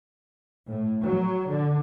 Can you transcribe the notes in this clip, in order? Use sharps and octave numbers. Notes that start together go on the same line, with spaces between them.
A2
F#3
D3